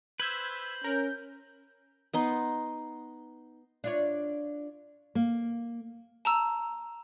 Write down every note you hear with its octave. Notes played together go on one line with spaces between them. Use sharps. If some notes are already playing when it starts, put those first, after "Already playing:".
B4 C5 E6 G6 G#6 B6
C#4 A#4
B3 D#4 C6
D4 F4 C#5
A#3
A5 A#5 E6